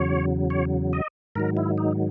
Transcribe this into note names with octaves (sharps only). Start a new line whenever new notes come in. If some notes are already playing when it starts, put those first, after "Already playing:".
Already playing: E2 C#3 F#3 C#5
C#5
D#5
G#2 D#3 F#3 A#4
E4
D#4